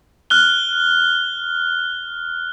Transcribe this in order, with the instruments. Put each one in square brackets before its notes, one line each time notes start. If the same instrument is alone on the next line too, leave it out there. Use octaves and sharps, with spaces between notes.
[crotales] F6 F#6 G7